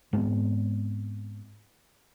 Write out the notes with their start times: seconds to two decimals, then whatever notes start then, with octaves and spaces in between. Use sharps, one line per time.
0.13 G#2 G#3 B3 C4